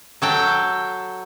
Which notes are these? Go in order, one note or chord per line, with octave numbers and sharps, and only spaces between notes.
F#3 A4 G5